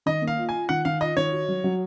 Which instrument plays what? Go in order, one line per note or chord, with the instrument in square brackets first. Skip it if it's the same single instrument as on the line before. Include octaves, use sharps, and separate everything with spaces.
[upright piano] D#3 [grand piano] D#5
[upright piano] A#3
[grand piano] F5
[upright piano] F4
[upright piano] F4 [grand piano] G#5
[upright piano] D#3 [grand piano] F#5
[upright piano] D#3 [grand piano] F5
[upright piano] F4 [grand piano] D#5
[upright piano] D#3 [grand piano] C#5
[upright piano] F#4
F#3
F#3